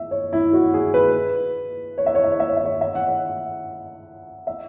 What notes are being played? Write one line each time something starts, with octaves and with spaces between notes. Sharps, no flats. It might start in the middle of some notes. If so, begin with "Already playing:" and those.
Already playing: E5
C#5
E4
F#4
G#4
B4
C#5
E5
C#5
E5
C#5
E5
C#5
E5
C#5
E5
F#5
E5
E5